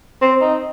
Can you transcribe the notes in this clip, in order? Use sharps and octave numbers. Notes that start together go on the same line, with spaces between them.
C4
D#4